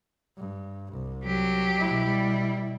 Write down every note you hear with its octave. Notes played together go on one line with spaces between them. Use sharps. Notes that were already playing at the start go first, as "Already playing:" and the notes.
G2
C2
F#3 G4
B2 E4
G3